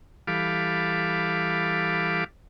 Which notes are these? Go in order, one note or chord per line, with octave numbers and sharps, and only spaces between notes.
E3 G3 A4 F5 B5 D6